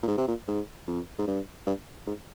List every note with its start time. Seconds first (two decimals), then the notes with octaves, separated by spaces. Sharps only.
0.03 A#2
0.08 G#2
0.18 C3
0.28 A#2
0.48 G#2
0.88 F2
1.18 G#2
1.28 G2
1.67 G2
2.07 G#2